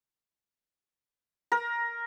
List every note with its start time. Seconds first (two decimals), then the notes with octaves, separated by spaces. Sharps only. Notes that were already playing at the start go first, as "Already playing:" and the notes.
1.52 A#4